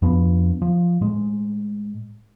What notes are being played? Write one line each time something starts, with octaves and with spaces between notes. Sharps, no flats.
F2 F3 B3 D4
F3
A2 G#3